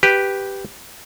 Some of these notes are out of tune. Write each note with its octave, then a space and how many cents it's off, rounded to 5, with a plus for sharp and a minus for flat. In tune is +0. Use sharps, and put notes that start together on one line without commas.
G4 +0 B4 +0